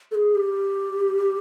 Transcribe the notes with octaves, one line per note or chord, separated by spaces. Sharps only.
A4
G#4
G4